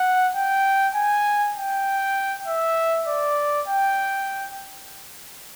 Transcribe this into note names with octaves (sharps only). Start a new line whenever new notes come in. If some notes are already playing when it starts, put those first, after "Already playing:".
Already playing: F#5
G5
G#5
G5
E5
D5
G5